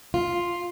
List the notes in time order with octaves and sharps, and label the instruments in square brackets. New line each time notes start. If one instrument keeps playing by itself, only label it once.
[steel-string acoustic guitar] F4